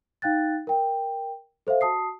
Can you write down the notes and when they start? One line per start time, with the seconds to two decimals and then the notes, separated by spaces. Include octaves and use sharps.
0.22 D#4 F5 G5 F#6 A6
0.67 A#4 G5
1.67 A4 C5 E5 F5
1.81 F#4 A5 D#6 C7